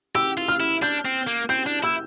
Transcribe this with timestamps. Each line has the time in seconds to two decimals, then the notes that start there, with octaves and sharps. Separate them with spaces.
0.15 G4 E6
0.38 F4
0.48 F6
0.60 E4
0.82 D4 G6
1.05 C4
1.27 A#3
1.49 C4 G6
1.66 D4
1.83 E4 E6